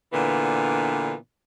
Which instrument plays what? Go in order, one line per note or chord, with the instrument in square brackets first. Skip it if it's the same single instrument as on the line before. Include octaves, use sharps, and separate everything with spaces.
[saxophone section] A#2 D3 E3 B3 D4